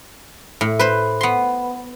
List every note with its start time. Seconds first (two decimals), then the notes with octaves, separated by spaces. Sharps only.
0.61 A2
0.79 B4 C5
1.21 B3 C6